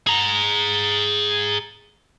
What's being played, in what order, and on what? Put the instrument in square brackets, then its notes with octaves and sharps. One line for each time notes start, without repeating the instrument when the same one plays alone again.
[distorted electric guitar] G#4 A#5